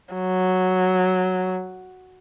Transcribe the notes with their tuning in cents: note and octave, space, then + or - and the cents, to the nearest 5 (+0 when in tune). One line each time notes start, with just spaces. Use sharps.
F#3 -5